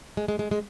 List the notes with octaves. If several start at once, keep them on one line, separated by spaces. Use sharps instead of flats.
G#3
G#3
G#3
G#3